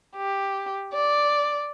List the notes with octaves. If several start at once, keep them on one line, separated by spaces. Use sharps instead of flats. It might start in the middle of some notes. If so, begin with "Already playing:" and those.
G4
D5